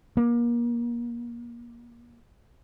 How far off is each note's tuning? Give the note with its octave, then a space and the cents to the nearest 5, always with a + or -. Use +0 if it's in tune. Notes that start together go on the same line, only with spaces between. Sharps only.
A#3 +30